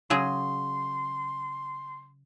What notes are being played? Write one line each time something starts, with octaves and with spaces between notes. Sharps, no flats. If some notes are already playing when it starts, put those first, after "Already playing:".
C#3 F#3 G#4 C6